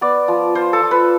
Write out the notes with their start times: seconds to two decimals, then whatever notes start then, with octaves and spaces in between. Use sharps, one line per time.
0.01 B3 D5
0.28 F3
0.55 F4 C5
0.73 A4
0.82 F3
0.91 B4